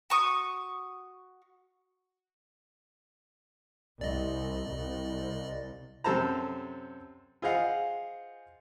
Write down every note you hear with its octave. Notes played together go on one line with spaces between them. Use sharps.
F#4 C#6 D#6
C2 D5 D#5
C2
F#2 C3 A4 C5 A5 A#5
F4 G#4 C5 D#5 F5 F#5